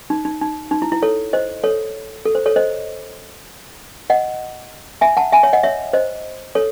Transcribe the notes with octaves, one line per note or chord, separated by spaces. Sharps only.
D#4
D#4
D#4
D#4
E4
E4
A4 C#5
C5 D#5
A4 C#5
A4
C5
A4 C#5
C5 D#5
D#5 F#5
E5 G#5
F#5 A5
E5 G#5
C#5 E5
D#5 F#5
C#5 E5
C5 D#5
A4 C#5